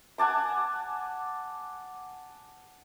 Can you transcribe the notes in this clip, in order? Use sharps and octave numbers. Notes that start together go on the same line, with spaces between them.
F#5 G#5 A5 D6